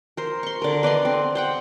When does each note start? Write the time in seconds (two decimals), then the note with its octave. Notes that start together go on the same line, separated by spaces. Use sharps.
0.17 A#4 C5
0.43 C6 C#6
0.62 D3 A#4
0.83 B4 D5 D#5 C6
1.05 C4
1.35 C5 F#5 G5